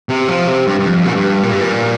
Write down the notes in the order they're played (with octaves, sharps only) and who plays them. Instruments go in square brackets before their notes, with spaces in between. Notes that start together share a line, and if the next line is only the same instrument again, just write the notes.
[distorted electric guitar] C3
F3
C3
G2
G2
F2
A#2
G2
A#2
G2
A#2